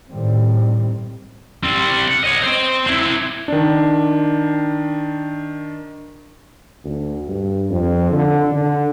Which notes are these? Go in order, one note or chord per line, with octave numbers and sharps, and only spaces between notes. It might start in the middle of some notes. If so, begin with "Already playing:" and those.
A2 D#3 G3 C4
G3 C4
F#5
C#5 D#5
C4 C5
C4 E4
D#3 D4
D2
G2
F2
D3
D3